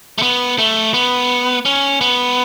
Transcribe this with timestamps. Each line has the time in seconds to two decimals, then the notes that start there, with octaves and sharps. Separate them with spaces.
0.18 A3
0.22 B3
0.59 A3
0.94 B3
1.65 C#4
2.01 B3